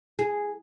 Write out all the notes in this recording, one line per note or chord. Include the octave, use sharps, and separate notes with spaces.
G#4